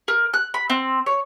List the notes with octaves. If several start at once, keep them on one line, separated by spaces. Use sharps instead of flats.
A#4
F#6
B5
C4
C#5